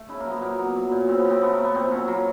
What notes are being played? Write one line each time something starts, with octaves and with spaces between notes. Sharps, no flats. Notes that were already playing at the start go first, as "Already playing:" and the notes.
Already playing: A3
C#3 E4
A#3
F#3
B3
A#2 A#3
F#3 B3
F#3
A#2
C#3 C4
B3
C#3
C4
A3 B3
A#3
A3
B3
A#2 C4
F#3 C#4
F#3 A#3